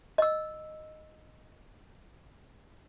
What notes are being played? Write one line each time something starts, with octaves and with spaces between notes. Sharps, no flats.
D#5 E6